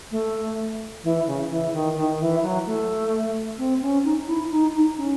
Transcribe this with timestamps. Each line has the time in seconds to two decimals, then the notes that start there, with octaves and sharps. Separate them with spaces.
0.11 A3
1.03 E3
1.26 C#3
1.49 E3
1.73 D#3
1.96 D#3
2.19 E3
2.42 F#3
2.66 A3
3.58 C4
3.81 C#4
4.04 D#4
4.27 E4
4.50 D#4
4.73 D#4
4.97 C#4